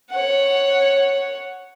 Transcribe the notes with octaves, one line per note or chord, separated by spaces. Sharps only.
C#5 F#5